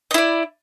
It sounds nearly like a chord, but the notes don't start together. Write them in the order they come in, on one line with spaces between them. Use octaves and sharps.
D#5 E4 D5